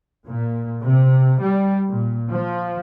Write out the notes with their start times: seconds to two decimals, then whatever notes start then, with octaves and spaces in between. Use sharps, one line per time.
0.26 A#2
0.83 C3
1.42 G3
1.89 A#2
2.31 F3